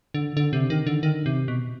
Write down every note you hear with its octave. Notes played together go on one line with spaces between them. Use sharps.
D3
D3
C3
D#3
D3
D#3
C3
B2